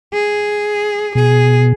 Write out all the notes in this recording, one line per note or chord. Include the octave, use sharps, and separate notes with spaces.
G#4
B2 G#4